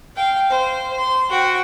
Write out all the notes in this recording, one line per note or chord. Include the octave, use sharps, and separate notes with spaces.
F5 G5
C5
C6
F#4 G5